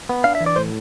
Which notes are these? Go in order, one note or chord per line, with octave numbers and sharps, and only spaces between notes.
B3
D4 F5
E5
E3
D5
A2 C5